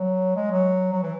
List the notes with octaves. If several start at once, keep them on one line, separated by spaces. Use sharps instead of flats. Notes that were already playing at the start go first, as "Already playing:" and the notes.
Already playing: F#3
G#3
F#3
F#3
E3